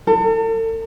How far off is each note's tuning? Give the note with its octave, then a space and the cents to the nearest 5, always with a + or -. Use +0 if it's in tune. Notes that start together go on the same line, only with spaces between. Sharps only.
A4 +40